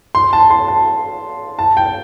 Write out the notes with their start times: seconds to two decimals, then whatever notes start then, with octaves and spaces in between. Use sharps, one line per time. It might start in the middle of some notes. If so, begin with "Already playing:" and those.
0.15 C6
0.33 A5
0.50 C6
0.68 A5
1.59 A5
1.77 G5